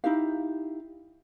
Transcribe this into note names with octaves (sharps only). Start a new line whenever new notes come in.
D#4 E4 G4 F5